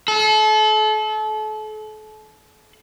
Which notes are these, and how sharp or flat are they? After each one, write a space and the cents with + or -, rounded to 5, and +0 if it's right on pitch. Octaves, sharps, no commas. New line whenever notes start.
A4 -35